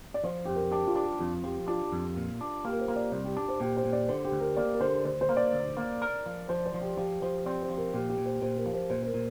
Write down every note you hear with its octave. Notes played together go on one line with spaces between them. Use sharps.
D5
F3 C5
F2 G4
A#4
D4 G4
F4
D4
G4
F2 F4
F3 G4
D4 F4
F2
A#2
D4
A#3 G4
A#4
C5
A#3
D5
C2 D5
G4
D4 G4
C5
A#2 G4
C5
A#2
D5
D3 C5
G4
D2
A#4
A#3 D5
A#4
D3 C5
D2 C5
C5
A#3
D5
D2
A#3
A#4
F3
F3 C5
C5
F3
G4
F3 G4
F3 C5
C4 D5
C5
F3
A#4
A#2 G4
G4
A#2
C5
A#2 C5
A#4
F3
C5
A#2 C5
C5
A#4
A#2